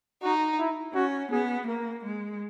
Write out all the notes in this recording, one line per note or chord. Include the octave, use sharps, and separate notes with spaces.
D#4 F#4
E4
C#4 F#4
B3 G#4
A#3 A#4
G#3